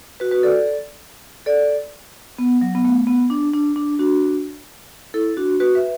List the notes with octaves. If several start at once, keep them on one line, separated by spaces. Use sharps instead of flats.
F#4 B4
F#4 B4
A4 D5
A4 D5
B3
F#3
B3
A3
B3
D4
D4
D4
D4 F#4
E4 A4
D4 F#4
F#4 B4
B4 E5